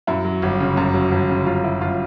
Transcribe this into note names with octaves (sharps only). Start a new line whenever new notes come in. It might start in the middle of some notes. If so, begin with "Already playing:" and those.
F#2 E4
F#3
G1
C#3
F#2
F#3
G1
C#3
F#2 F4
F#3 E4
G1 F4